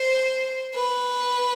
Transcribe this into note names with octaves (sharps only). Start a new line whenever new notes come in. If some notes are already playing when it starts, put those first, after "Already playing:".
Already playing: C5
B4